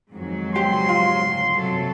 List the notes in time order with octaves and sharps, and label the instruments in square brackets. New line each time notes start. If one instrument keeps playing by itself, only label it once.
[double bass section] F2 D#3 [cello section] G#2 F#3
[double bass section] C#3 G3 B3 [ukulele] G4 [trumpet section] C6
[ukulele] F4
[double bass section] F#1 D2
[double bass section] F#2 C3 [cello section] F#3 A4